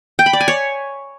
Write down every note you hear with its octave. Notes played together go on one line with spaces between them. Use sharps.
G5
B5
D5
G#5
C#5